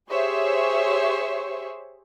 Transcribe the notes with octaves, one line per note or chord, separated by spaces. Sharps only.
G4 G#4 C5 C#5 E5 C#6